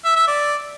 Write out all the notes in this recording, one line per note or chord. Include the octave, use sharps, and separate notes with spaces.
E5
E5
D5